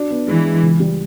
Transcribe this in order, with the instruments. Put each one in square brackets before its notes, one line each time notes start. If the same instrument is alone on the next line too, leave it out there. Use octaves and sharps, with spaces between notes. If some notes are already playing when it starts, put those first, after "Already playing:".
Already playing: [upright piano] D4 F#4
B3
[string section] E3 [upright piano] G#3
[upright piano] G#3
C#2
G3